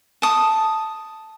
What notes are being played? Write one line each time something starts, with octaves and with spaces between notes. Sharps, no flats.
A5 D#6